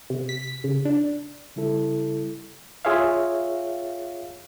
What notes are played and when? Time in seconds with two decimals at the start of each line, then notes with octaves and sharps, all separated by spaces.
0.10 C3
0.29 B6
0.64 C#3
0.85 D4
1.56 C#3 G3 E4 A4
2.85 F4 G#4 C#5 E5 F5